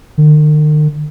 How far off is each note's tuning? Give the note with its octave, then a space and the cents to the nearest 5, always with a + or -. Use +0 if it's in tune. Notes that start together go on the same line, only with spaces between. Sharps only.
D#3 -45